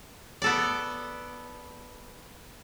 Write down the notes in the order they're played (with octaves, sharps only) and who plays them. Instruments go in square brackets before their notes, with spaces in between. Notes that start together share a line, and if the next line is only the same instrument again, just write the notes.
[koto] B3 A4 D5